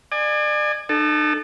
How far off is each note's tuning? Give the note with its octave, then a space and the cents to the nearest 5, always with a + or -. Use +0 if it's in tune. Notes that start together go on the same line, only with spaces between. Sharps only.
D5 +35 G#5 -5
D#4 -45 A4 -10